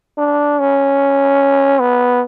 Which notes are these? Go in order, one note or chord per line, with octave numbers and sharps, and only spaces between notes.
D4
C#4
B3